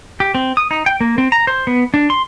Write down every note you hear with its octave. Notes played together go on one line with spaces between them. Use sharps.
G4
C4
D#6
D#4
G5
A#3
C4
A#5
C5
B3
D4
C6